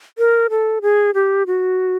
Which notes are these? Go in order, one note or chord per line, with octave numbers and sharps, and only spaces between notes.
A#4
A4
G#4
G4
F#4